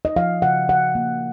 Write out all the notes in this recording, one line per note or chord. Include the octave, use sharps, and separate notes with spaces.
D#5
F3 F5
C#3 F#5
C#3 F#5
A#3